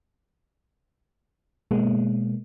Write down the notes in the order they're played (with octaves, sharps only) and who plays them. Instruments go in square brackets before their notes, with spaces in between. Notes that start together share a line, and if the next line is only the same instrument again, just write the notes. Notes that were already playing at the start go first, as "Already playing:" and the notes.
[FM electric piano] B2 G#3 A#3 B3